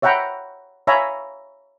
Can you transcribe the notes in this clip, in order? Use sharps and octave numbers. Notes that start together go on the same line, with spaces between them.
C#5 E5 F#5 G5 A#5 B5
C#5 E5 F5 G#5 A#5 B5